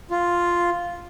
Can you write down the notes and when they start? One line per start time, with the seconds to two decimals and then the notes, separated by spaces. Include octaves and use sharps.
0.10 F4